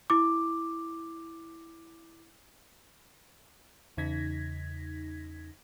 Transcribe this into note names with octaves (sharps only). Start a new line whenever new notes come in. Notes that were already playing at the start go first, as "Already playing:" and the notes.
E4 D6
E2 C#3 D#4 G#6 A#6 B6